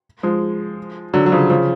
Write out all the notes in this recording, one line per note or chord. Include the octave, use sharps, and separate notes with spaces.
F3 G#3
D3 F#3
F#3
C#3 F3
C#3 F3